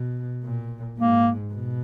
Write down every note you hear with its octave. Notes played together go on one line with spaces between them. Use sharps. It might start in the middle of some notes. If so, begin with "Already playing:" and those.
Already playing: B2
A#2
G#2 A#3
B2